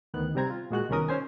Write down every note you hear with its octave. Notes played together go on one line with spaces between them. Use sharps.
D2 D#3 B3 F#6
C3 G3 C4 A#5 G#6
F4
A#2 G#3 F#4 F#6
C2 B2 D#3 C#4 A#4 D#6
C#4 C5 G#5